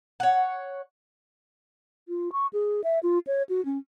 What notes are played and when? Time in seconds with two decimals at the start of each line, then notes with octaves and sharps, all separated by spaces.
0.20 C#5 F#5
2.08 F4
2.32 C#6
2.53 G#4
2.84 E5
3.03 F4
3.27 C#5
3.49 F#4
3.65 C#4